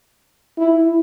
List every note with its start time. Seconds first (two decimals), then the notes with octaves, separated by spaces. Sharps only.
0.59 E4